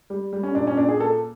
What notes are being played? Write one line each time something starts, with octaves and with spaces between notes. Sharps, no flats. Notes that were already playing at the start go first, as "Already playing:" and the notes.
G3
G3
C#4
A#2 D4
C#4
A#2 D4
G#4
A#3 A4